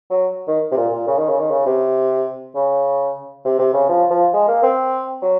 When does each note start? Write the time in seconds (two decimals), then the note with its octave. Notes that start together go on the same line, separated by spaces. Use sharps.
0.10 F#3
0.48 D#3
0.72 C3
0.77 A#2
0.93 A#2
1.07 C#3
1.18 D#3
1.29 C#3
1.40 D#3
1.51 C#3
1.66 C3
2.55 C#3
3.45 C3
3.59 C3
3.74 C#3
3.89 F3
4.11 F3
4.33 G#3
4.48 A#3
4.63 C4
5.22 F#3